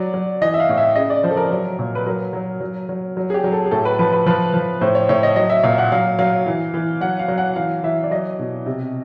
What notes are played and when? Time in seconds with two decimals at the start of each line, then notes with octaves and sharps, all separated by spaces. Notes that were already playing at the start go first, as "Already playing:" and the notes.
Already playing: F#3 D5
0.14 F#3
0.41 E3 D#5
0.54 E5
0.60 F5
0.69 A2
0.78 E5
0.96 C#3 D#5
1.10 D5
1.23 F3 C5
1.31 A4
1.37 A#4
1.51 F#3
1.79 A#2
1.95 B4
2.06 F#3 A#4
2.33 F#3
2.61 F#3
2.89 F#3
3.17 F#3
3.30 G#4
3.34 G4
3.44 F#3
3.52 A4
3.66 G#4
3.71 A2 A4
3.85 B4
3.99 F3 B4
4.13 B4
4.26 F3 B4
4.54 F3
4.81 A2 C5
4.95 C#5
5.09 A2 C#5
5.23 D#5
5.36 F#3 D#5
5.49 E5
5.63 A#2 F5
5.78 F#5
5.92 F#3 F5
6.19 F#3 F5
6.47 E3
6.74 E3
7.01 F#3 F#5
7.19 F5
7.28 F#3
7.38 F#5
7.56 E3 F5
7.83 E3 E5
8.04 D5
8.11 F#3 D#5
8.39 B2
8.66 C3